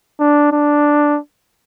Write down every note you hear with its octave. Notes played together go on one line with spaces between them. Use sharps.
D4
D4